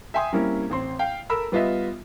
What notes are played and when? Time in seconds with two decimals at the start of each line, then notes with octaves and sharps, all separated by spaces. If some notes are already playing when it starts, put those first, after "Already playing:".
0.14 E5 G5 G#5 C6 D#6
0.33 G3 A#3 C4 C#4 E4
0.70 A1 C4 C6
0.99 F5 G5
1.29 A4 A#4 B5 E6
1.52 G3 B3 F4 D#5 E5